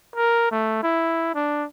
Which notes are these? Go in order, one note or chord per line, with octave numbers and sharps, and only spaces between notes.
A#4
A3
E4
D4